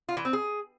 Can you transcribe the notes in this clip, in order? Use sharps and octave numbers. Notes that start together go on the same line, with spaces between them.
F4
E3
C4
G#4